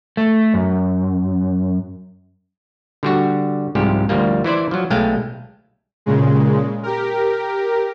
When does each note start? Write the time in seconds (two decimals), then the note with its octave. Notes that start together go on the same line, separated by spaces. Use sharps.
0.17 A3
0.54 F#2
3.03 D3 G3 F#4
3.75 C2 G#2 F3 G4
4.09 D2 F3 G3 A#3
4.44 E3 E4 C5 D5
4.71 F3 F#3
4.90 B1 G#3 A3 F5 G5
6.06 A#2 C#3 G#3
6.83 G4 A#4